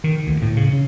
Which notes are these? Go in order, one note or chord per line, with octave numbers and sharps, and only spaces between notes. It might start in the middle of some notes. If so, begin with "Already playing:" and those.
D#3
D2
A2
C#3
C#3